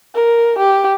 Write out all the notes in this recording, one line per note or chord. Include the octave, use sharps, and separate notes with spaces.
A#4
G4